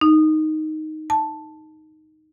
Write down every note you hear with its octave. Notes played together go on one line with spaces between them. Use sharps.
D#4
A5